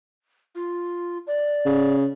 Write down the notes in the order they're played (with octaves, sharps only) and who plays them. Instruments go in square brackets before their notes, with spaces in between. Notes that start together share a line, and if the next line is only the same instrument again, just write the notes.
[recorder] F4
D5
[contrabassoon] C#3